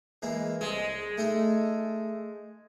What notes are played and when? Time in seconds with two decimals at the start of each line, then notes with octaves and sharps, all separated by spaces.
0.22 E3 G#3 A#3
0.61 C2 G#3 G#5
1.17 A3 D#4 A4